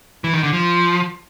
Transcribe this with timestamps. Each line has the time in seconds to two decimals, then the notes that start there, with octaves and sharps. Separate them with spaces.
0.24 E3
0.34 D#3
0.43 D3
0.53 F3